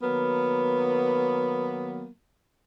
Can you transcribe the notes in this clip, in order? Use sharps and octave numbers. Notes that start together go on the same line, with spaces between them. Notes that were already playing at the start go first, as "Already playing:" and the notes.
D#3 F#3 A#3 B3